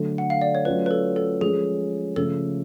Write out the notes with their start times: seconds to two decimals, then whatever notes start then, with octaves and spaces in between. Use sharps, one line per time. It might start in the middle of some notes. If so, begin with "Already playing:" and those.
Already playing: D3 F#3 A3
0.18 F#5
0.30 F5
0.41 D5
0.55 C#5
0.65 F#3 A3 C#4 F4 B4
0.86 B4
0.91 A4
1.16 A4
1.41 F3 G#3 C#4 G#4
2.16 C#3 F3 A3 A4